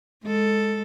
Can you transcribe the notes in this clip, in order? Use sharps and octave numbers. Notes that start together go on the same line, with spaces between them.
G#3 A4